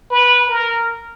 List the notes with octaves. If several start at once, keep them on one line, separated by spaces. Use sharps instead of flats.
B4
A#4